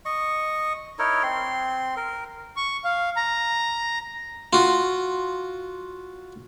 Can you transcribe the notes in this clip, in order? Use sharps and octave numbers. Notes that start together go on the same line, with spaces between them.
D#5 C#6
D#4 E4 A#4 C#5
C4 C6
A#4
C#6
F5
A#5
F4 F#4